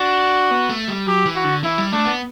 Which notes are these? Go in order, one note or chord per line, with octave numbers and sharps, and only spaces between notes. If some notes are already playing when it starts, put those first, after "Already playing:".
Already playing: D4 F#4
B3
A3
G3
F#3 G4
E3
F#4
D3
E3 E4
G3
A3 D4
B3